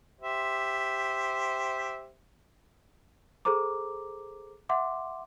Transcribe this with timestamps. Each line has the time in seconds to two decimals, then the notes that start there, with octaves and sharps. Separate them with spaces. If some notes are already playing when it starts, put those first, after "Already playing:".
0.21 G4 C5 E5
3.45 G#4 A4 C5 A#5 D6
4.69 E5 F#5 C6 D6